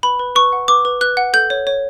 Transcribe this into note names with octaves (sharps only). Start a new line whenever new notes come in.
B4 B5
B4
B4 C#6
F#5
B4 D6
B4
B4 F#6
F#5
A4 G6
C#5
C#5